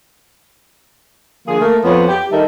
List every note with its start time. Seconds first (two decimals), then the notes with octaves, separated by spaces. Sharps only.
1.47 D3 F3 A#3 G#4
1.60 A3 A#3 A#4
1.83 F2 F3 B3 C#5
2.08 G4
2.31 D#3 G3 D#4 A4 A#4 E5